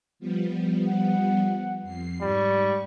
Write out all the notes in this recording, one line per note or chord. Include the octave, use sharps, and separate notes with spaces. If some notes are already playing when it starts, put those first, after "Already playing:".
F3 G3 B3
F#5
F2 C7
G#2 G3 C#6